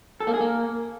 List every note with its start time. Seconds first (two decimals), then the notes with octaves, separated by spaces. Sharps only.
0.20 A4
0.27 A#3
0.34 G#4
0.40 A#3